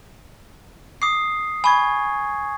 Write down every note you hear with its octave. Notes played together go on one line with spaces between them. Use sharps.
D6 D#6 C7
G#5 B5 C#6 G#6